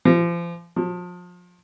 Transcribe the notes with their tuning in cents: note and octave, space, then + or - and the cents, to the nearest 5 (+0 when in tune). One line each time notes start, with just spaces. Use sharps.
F3 -35
F3 +30